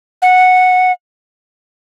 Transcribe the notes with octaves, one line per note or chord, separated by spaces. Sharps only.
F#5